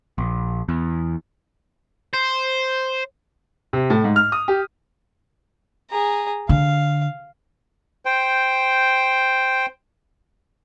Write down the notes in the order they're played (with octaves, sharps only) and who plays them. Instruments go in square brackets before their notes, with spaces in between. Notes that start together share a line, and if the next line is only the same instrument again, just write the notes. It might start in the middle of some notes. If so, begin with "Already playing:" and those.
[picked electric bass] A#1
E2
[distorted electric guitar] C5
[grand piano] C3
A2
G#2
F6
D#6
G4
[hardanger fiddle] G#4 A#5
[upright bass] D3 [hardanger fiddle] F5
[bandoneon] C5 G5